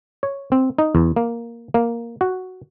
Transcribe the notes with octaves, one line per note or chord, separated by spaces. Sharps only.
C#5
C4
D#4
E2
A#3
A#3
F#4